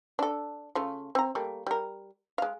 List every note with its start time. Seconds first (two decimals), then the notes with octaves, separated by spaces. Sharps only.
0.19 D4 A4
0.75 C#3 A3 F4
1.15 C4 A#5
1.35 G3 A3 A#3
1.67 G3 A#4
2.38 G#3 F5